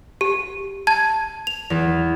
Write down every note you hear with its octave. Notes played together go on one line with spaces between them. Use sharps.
G4
A5 G#6
F7
E2